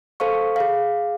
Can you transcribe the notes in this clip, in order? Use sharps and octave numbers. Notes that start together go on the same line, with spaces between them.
A4 C5 F5 C#6
G#4 F5